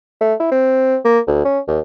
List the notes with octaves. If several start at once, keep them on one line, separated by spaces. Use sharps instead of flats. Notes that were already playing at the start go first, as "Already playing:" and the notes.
A3
E4
C4
A#3
D2
C#4
D#2